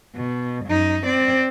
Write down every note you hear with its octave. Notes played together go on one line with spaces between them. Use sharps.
B2
F#2 D#4
C4 D5